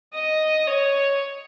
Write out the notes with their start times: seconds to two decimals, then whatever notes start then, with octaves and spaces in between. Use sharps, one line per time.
0.14 D#5
0.67 C#5